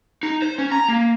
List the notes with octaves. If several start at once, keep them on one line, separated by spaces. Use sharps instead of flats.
D#4
C5
C#4
A#5
A#3